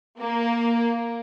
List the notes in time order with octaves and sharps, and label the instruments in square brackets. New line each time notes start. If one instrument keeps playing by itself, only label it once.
[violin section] A#3